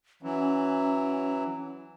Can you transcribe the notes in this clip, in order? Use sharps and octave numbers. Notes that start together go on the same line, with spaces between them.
E3 F#3 C#4